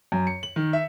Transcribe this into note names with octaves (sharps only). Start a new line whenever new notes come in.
F#2
C#7
F#7
D#3
E5